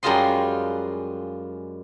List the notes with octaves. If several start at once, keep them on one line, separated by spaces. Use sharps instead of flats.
F#2 G3 G#3 F4 D#5 C6